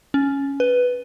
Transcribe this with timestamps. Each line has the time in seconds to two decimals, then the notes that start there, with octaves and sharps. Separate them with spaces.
0.14 C#4
0.60 B4